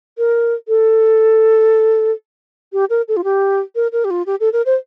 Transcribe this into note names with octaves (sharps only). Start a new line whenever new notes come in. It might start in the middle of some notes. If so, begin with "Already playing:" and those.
A#4
A4
G4
A#4
A4
F4
G4
A#4
A#4
G4
F4
G4
A4
A#4
C5